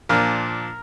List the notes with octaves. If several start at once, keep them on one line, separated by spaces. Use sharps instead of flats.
A#2 F3 D4 A#4